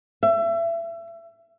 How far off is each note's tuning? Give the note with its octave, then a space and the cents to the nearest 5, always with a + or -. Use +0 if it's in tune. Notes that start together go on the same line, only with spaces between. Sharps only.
E5 +30